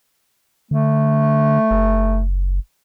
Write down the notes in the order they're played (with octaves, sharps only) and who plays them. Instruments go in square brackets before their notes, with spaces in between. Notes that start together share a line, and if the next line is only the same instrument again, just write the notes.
[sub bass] D3 [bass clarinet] A3
[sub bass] F#1